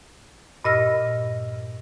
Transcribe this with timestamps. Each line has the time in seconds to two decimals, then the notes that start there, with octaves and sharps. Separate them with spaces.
0.65 G2 A#2 D#5 E6 F6 A#6